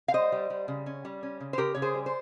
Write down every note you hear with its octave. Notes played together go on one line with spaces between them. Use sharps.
F5
G3 C5 D#5
G3
G3
C#3
C#4
G3
C#4
C#3
C5
C#3 G4 A#4
C#3 C#5
G#4 C5
G3
C5